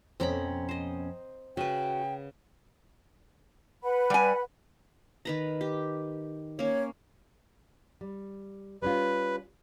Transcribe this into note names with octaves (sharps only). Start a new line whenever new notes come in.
F2 B2 C4 C#4 A#5 B5
C5 D#5
C#3 F#4 B4 G5
B4 F#5 B5
G3 G#5
D#3 B4 A#5
G4
A#3 C#4 C#5
G3
G3 C#4 F4 B4